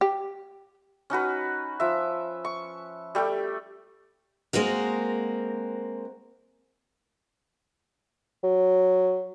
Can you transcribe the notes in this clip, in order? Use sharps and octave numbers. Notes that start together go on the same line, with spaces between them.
G4
C#4 D#4 F#4 B4
F3 E5
C#6
G3 A3 G4 G5
G#3 A#3 C4 F#4 A#4
F#3